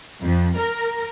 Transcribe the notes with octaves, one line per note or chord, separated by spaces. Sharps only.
F2
A#4